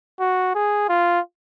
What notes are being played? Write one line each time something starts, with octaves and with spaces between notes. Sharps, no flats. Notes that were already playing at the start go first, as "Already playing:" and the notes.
F#4
G#4
F4